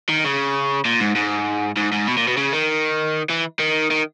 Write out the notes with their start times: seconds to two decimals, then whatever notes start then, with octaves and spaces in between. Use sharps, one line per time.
0.09 D#3
0.24 C#3
0.85 A#2
1.00 G#2
1.16 G#2
1.77 G#2
1.92 G#2
2.07 B2
2.17 A#2
2.28 B2
2.37 C#3
2.53 D#3
3.30 E3
3.60 D#3
3.91 D#3